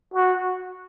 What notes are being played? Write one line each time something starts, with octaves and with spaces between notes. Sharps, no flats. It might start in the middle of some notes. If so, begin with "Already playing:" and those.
F#4